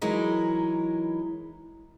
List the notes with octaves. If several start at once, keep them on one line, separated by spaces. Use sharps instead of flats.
E3 F#3 G#3 D#4 E4 A#4